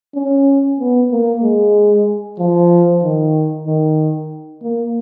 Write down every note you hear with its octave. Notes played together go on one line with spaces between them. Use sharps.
C#4
B3
A#3
G#3
F3
D#3
D#3
A#3